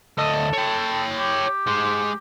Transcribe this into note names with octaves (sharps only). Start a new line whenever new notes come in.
D2 A4 D#5
C#5 G5
G4
G#3 C5